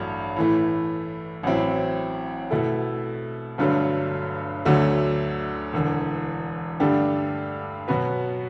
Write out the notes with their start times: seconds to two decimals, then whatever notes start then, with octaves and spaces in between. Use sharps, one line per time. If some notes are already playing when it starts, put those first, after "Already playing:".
Already playing: A1 G2 F#3 A3 D4
0.37 A2 E3 A3
1.43 A1 A2 F#3 C4 E4
2.51 B2 A3 E4 A4
3.58 G1 G2 D3 F#3 A3
4.65 D2 D3 F#3 A3
5.73 E1 E2 D3
6.80 G2 D3 A3 D4 G4
7.88 B2 F#3 B3 F#4 B4